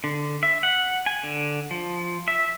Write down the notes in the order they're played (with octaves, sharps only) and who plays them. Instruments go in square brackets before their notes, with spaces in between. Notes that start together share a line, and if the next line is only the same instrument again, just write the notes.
[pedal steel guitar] D3
E5
F#5
G#5
D3
F3
E5